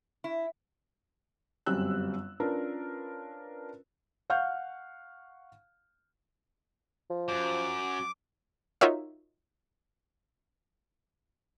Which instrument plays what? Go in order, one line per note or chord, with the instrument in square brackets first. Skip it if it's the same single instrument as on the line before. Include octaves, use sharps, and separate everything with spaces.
[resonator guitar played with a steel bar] E4
[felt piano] G1 F#2 G3 C4 E6 F#6
C#4 D4 F4 A#4 B4
F5 F#5 C#6 F6 G6
[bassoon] F3
[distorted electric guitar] F#2 [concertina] D6
[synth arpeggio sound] D#4 F4 F#4 A#4 C#5 E5